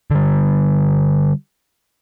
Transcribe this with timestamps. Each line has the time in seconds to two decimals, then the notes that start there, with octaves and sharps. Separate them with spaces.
0.11 D3 G3